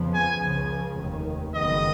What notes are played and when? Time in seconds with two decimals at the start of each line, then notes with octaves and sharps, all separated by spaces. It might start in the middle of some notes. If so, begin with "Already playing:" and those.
Already playing: F2 C#3 F3 B3
0.14 G#5
0.42 C#2 C#3 F3
0.99 F1 D#2 D#3
1.54 F#1 F2 D#3 G#3 B3 D#5